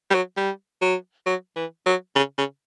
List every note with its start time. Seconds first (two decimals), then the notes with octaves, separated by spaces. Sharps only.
0.10 G3
0.15 F#3
0.37 G3
0.82 F#3
1.26 F#3
1.56 E3
1.86 F#3
2.16 C#3
2.38 C#3